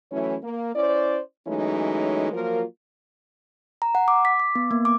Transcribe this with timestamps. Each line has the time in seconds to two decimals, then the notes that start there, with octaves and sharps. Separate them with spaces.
0.12 E3 F#3 A3 C#4 E4 C#5
0.43 A#3
0.75 C#4 E4 C5 D5
1.47 E3 F#3 G#3 A3 C#4 D#4
2.33 F3 F#3 A#3 F4 A#4
3.82 A#5
3.95 F#5
4.08 D6
4.25 B6
4.40 D6
4.55 B3
4.71 A#3
4.85 D6